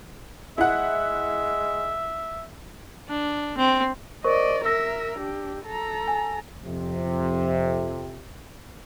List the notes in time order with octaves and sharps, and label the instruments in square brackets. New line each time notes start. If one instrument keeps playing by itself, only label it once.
[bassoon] G#3 [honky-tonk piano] E4 F#5 [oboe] E5
[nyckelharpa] D4
C4
[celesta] A#4 C5 C#6 [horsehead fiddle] D5 D#5
[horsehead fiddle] A#4 E5 [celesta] E6 A#6
[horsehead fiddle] D4 G4
A4 A#5
[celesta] G#5
[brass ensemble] F2 C3